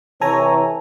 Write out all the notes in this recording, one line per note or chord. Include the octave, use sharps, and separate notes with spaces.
C3 E3 A4 C#5 G#5 A#5